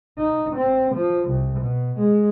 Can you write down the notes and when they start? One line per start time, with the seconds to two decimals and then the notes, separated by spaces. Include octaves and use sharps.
0.18 D#4
0.56 C4
0.95 F3
1.30 C2
1.60 B2
1.99 G#3